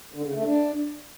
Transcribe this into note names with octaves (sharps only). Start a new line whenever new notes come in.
D3
C#3
A3
D4